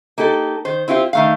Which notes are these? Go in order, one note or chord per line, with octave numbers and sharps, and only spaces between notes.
A#3 D#4 G4 A4
D#3 C5
C4 E4 F4 G4 C5
D#3 A3 F5